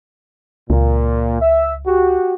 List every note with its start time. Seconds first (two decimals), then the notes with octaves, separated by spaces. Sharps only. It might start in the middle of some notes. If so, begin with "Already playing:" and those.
0.70 C#2 A#2
1.42 E5
1.86 F#4 G4